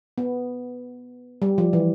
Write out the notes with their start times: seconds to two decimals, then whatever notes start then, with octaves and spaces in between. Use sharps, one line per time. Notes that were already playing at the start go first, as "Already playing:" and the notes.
0.18 B3
1.42 G3
1.58 F3
1.73 E3